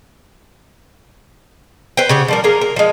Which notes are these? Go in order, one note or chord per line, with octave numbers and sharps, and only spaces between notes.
B4 C5 G5
C#3 G4 F#5
F3 G3 A#4
A#3 G#4 A#4
A#4
F3 G#3